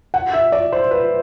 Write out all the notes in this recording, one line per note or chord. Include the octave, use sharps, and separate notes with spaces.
F#5
E5
D5
C5
B4